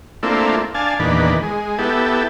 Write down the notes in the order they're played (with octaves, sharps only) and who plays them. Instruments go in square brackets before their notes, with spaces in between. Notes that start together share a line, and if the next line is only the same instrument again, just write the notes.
[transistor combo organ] A3 A#3 C4 D4 E4 F4
D4 F5 G#5 A5
E2 A#2 D#3 D4 B4
G#3
B3 E4 G4 A4